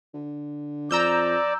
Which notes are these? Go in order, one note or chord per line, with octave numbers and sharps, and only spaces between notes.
D3
F2 D5 A#5 E6 G6